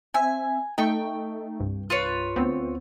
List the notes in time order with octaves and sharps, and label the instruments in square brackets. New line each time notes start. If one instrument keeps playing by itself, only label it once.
[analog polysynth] C4 E5 [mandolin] G#5
[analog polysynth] A3 D#4 [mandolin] G5 C#6
[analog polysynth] C2 G2
[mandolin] F4 B4 C#5
[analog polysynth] D2 B3 C4